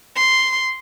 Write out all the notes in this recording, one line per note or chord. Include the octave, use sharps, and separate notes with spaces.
C6